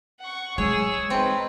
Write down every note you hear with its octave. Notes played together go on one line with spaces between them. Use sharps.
F#5 C#6
G#3 G#4 C#5 E6
C4 D#4 B4